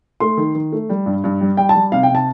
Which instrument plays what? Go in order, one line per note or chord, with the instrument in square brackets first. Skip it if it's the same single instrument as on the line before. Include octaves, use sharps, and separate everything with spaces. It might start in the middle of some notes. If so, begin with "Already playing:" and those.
[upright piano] A3 C6
D#3
D#3
A3
G3
G2
G2
G3
G3 G5
A5
G3
C3 F5
G5
C3 A5